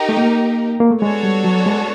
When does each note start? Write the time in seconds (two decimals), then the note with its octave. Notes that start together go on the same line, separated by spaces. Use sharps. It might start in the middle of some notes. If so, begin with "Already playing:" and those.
Already playing: D#4 G4 A#4
0.09 A3
0.17 A#3
0.80 A#3
0.91 A3
1.02 G#3 B3 D4 F#4 A4 C#5
1.23 G3
1.44 F#3
1.66 G#3